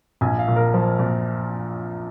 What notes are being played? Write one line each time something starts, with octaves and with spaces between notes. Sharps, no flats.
A#1 G#5
F5
A#2
A#4
F3
A#2